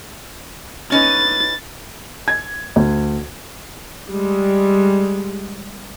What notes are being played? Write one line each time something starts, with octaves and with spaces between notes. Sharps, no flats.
C#4 D#4 B4 A6
G#6
D2
G3 G#3